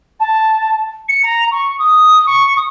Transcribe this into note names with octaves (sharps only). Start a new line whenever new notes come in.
A5
C#7
A#5
C#6
D#6
C#6
D#6